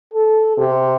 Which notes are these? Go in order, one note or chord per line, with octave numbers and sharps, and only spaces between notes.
A4
C3